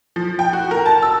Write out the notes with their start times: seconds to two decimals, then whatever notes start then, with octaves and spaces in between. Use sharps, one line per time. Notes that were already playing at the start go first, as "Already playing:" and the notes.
0.16 F3
0.39 G5
0.53 F#4
0.71 A#4
0.86 A5
1.02 E6